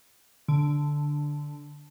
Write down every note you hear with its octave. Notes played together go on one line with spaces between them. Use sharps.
D3